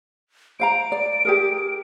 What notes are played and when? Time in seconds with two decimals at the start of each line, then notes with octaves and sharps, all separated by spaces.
0.60 C5 F5 A#5 D7
0.92 D5
1.25 G4 G#4 A#4